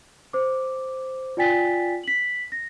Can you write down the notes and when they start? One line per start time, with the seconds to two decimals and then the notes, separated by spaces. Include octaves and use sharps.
0.33 C5 D6
1.37 F4 D5 G5 G#5 A6 B6
2.03 B6 F#7
2.52 A#6